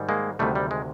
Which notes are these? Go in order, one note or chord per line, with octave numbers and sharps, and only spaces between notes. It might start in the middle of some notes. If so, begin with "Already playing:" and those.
Already playing: G#2 D#3 G3
G#3 A#3
D2 C3 D#3 G3 A3
G3
G#3